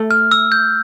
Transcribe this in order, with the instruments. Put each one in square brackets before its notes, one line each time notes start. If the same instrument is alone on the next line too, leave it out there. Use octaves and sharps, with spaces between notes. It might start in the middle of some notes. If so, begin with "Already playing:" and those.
Already playing: [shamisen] A3
[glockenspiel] F6
E6
G6